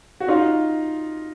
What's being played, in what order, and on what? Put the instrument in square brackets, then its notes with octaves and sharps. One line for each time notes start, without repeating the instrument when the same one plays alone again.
[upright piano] F#4
D#4 F4